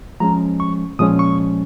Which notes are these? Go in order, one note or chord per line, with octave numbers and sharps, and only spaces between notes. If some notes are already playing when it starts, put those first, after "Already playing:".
F3 G#3 C#4 A#5
C#6
A#2 F3 G#3 C#4 D#6
C#6